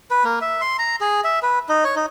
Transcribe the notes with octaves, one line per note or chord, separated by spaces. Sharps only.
B4
A#3
E5
C6
A#5
G#4
E5
B4
D#4
C#5
D#4